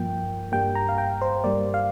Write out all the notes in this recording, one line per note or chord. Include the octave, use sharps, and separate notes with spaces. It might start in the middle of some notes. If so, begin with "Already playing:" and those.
Already playing: G2 F3 A#3 G5
G2 G3 A#3 G5
A#5
F5
G5
C5
G2 G3 A#3 D5
F5